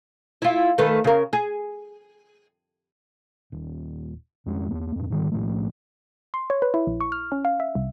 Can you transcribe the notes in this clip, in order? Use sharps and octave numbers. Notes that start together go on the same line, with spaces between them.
E4 F4
D#3 A3 B4
C#3 A#4
G#4
D#1
F2 G#3 C#4
E2 A#3
F2 A2
G#2 D#3 G3
B1 A2 F3 A3
C6
C#5
B4
E4
A#1
C#6
F6
C#4
F5
E5
C2